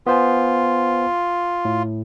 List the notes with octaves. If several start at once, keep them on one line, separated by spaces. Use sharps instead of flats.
B3 F4 C5 G#5
A2